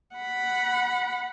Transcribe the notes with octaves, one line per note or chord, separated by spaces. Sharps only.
F#5 B5